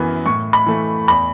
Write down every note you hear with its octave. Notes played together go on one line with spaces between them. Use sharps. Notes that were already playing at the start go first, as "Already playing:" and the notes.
Already playing: F#2 E3 B3
A2 C#6
B5
E3 A3
E2 B5